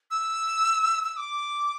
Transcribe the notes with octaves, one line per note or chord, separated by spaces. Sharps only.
E6
E6
D6